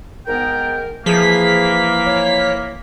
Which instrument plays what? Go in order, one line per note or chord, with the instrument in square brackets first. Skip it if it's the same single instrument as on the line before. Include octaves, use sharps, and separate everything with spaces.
[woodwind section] G#2 B3 G5 [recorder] A#4
[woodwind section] E3 A#3 [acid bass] F3 [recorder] G#4 [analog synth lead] B6
[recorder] C#5